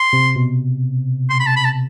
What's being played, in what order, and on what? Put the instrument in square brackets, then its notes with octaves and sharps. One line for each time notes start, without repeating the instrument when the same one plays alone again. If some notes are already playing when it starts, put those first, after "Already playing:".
Already playing: [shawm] C6
[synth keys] C3
B2
[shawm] C6
B5
A5
B5
A5